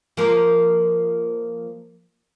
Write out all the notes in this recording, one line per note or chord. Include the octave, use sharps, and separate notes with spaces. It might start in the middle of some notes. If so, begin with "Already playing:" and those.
F3 A#3 A#4